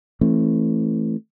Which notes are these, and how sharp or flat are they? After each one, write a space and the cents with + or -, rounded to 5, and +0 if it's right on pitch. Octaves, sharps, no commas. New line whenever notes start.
E3 +5 A3 +0 C4 +40